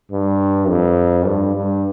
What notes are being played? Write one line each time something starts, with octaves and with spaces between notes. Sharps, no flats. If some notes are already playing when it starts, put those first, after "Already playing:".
G2
F2
G2
G2